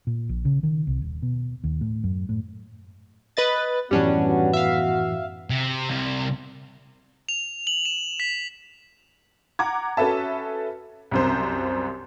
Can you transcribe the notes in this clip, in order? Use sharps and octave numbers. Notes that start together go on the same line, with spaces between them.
A#2
A#1
C#3
D#3
C2
D#1
B2
D#2
A2
F#2
A2
B4 D#5 A6
F#2 A2 E3 G3 B3 C#4 D4 F#4
E5 F5
C3
C2 C3
F7
F#7
E7
B6
F#5 A#5 D6 G#6
C#4 F#4 A4 B4 E5 A5
C2 F#2 C5